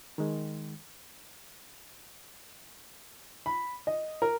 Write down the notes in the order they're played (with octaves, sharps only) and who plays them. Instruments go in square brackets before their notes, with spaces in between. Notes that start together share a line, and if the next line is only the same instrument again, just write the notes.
[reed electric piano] D#3 G#3
[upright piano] B5
D#5
A#4